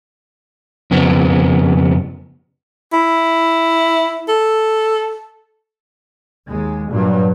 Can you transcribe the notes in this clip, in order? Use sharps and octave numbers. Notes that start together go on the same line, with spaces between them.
F2 C#3 B3
E4
A4
D#2 G#3
G2 A#2 F#3